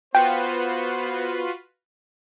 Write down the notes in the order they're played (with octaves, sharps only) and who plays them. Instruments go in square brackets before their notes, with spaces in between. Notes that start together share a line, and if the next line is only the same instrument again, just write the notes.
[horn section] B3 C5 [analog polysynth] F4 F#4 B4 [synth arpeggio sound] G5